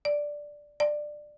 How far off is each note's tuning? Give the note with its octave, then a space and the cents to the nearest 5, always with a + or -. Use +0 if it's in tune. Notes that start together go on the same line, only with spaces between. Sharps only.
D5 +0
D5 +15